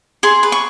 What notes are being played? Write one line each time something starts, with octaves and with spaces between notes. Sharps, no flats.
G#4 C6
B4
C#6